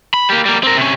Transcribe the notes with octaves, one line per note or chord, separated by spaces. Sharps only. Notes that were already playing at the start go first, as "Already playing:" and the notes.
B5
A#3 G4
G3 A#3
C4 A#4
C3 C#4